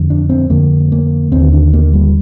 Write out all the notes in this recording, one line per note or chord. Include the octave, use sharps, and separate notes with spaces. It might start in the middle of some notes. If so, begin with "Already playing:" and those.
Already playing: F2 D3
D4
C4
F2 D3 A#3
A#3
D#2 D3 C4
D4
A#3
G3